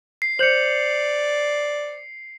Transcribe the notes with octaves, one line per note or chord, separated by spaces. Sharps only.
C7
C5 D5 G6 C#7 F7 F#7